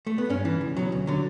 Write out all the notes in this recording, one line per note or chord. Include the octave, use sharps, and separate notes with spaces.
A3
B3
G2 C#4
E3
C#2
B2 F#3
D2
D3 F#3